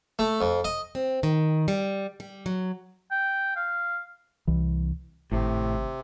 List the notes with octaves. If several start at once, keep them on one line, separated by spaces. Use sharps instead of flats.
A3
F2
D#5
C4
D#3
G3
G3
F#3
G5
F5
C2 E3
G#1 A2 C3